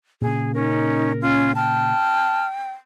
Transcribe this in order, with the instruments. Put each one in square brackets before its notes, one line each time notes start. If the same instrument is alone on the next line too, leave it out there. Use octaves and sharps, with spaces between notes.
[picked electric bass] A#2 C#3 [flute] G#4
[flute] C#4 [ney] D#4 [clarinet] A#4
[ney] C#4 [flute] F4
[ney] G5 [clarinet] A5 [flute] F6